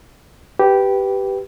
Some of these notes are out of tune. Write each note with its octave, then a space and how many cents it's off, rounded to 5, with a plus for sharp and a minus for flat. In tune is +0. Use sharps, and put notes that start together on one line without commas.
G4 -10 B4 +0